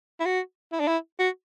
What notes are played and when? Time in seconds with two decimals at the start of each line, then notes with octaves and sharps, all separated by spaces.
0.20 E4
0.26 F#4
0.72 E4
0.80 D4
0.88 E4
1.19 F#4